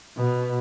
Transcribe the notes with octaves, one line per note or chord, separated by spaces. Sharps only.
B2